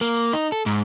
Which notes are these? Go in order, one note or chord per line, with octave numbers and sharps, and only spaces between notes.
A#3
D#4
A4
G#2